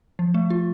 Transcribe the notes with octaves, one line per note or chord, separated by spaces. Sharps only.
F3
A3
F4